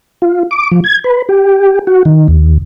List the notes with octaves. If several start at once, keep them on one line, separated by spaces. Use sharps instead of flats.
F4
D6
F3
G#6
B4
G4
F#4
D#3
D#2